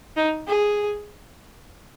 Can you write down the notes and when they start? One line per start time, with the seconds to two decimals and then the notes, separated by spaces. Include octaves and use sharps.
0.16 D#4
0.47 G#4